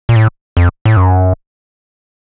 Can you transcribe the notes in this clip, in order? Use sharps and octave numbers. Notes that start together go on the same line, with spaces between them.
A#2
A2
F2
A2
F#2